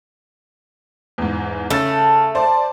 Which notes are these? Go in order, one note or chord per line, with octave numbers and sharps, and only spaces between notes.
E2 G#2
C#3 A3 A6
C5 D5